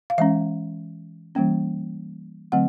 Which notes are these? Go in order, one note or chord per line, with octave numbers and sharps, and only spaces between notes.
F5
E3 G#3 C#4 E5
E3 G3 A#3 C#4
D3 F#3 A3 C4 F#5